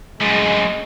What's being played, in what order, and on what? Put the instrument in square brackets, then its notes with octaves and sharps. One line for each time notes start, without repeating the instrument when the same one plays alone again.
[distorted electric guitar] F#2 A2 [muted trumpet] G#3